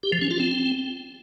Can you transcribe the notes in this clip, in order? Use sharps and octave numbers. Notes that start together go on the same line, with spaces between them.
G4
F3
C#4
F4
C4